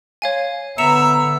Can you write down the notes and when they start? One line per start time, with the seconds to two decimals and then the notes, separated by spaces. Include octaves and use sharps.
0.22 C#5 F5 G#5
0.78 D3 B3 E5 A#5 C#7 E7 F7